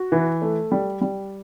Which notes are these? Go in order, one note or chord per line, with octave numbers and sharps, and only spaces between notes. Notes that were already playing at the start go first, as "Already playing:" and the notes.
Already playing: F#4
E3
A3
G3
G3